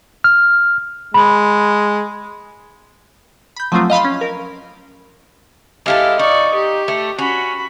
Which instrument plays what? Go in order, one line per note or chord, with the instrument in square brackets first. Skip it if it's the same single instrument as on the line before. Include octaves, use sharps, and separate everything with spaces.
[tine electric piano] F6
[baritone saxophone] G#3 [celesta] B5
[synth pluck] B5 G6
F3 F#3 A3 C4 F4
D#5 F5 B5 C6
C#4
A#4
[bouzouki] G#3 E4 A4 [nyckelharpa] G4 F5
[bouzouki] D#4 [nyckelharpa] D5 C#6
[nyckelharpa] G4
[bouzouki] A3
[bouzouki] C#4 [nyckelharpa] F#4 B5